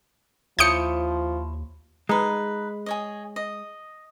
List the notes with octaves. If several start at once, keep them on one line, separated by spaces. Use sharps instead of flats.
D#2 F3 E4 C#5 D#6 G6 C#7
G#3 D#4 B4
G#4 C#5 D#5
D#5